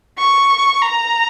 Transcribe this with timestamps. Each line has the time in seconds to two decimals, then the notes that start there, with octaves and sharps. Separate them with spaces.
0.18 C#6
0.82 A#5